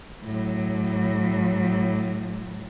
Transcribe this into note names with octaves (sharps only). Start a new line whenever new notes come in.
A2 F#3